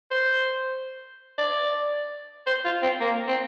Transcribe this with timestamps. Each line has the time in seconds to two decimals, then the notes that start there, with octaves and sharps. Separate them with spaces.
0.11 C5
1.38 D5
2.46 C5
2.65 F4
2.82 C4
3.00 A#3
3.27 C4